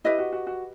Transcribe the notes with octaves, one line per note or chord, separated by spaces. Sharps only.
E4 G4 B4 D#5
F#4
F#4
F#4